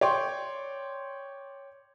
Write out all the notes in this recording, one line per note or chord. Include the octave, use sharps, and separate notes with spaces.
C#5 D5 G5 C6